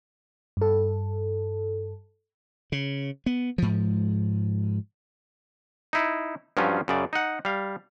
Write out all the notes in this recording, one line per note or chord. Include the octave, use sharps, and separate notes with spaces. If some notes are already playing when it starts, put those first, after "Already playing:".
G2 A4
C#3
B3
G#2 F3
D#4 E4
G2 F3 F#3 C#4 F4
F#2 C#3 D5
D#4 F#5
G3 F5